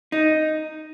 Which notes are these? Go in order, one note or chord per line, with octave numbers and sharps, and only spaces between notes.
D#4